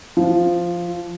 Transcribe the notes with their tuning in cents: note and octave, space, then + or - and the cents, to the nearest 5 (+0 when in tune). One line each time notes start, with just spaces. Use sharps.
F3 -5